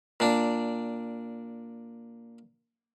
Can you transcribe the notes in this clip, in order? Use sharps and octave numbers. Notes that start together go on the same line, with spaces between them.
A#2 D4